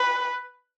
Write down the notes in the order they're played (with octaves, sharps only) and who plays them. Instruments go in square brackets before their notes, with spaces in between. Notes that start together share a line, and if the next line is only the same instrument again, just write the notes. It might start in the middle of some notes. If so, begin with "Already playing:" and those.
Already playing: [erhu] B4